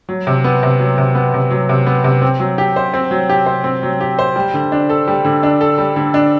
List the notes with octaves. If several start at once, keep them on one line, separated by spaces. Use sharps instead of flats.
F#3
C3
B3
C3
F#3
C3
B3
C3
F#3
C3
B3
C3
C4
F#3
G4
C5
C4
F#3
G4
C5
C4
F#3
G4
C5
G3
D3
D4
A4
G3
D3
D4
A4
G3
D3
D4